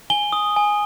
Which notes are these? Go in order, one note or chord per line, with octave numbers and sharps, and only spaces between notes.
G#5 G7
D#6
G#5